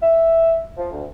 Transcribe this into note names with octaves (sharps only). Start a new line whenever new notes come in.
E5
F3
D2